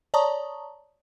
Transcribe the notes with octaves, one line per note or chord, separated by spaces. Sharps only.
C#5 D5 A5 A#5 C#6 D#6